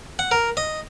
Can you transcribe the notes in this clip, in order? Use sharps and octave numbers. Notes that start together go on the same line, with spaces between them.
F#5
A#4
D#5